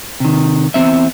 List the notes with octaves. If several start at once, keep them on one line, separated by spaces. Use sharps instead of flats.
C3 D#3
E2 C#3 C4 E5